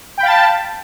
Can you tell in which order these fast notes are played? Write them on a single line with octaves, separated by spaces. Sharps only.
G5 B5 F5 A6 A5